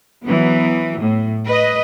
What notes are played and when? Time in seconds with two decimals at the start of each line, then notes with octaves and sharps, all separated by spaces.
0.25 E3 F#3 B3
0.99 A2
1.47 B4 D#5